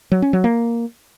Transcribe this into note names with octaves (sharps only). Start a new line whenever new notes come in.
F#3
C#4
F#3
A#3